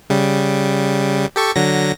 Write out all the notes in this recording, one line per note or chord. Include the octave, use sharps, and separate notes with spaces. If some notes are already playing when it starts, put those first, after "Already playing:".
C#3 G3
G4 A4 C#6
D3 F#3 A#6